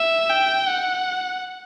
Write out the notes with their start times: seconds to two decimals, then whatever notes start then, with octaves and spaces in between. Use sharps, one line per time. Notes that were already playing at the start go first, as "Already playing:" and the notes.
Already playing: E5
0.30 G5
0.68 F#5